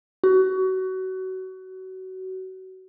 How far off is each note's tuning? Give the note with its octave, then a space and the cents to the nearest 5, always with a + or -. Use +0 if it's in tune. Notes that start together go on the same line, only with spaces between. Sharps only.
F#4 +25